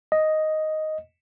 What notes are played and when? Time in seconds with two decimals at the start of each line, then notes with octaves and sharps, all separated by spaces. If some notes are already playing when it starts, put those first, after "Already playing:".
0.12 D#5